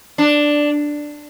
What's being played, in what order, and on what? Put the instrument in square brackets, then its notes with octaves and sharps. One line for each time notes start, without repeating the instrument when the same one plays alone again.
[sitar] D4